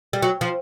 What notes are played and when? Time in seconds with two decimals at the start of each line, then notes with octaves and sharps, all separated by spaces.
0.13 G3
0.22 F#3
0.41 F3